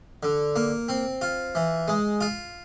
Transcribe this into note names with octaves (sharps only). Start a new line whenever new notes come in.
D3
A#3
C4
F4
E3
G#3
F4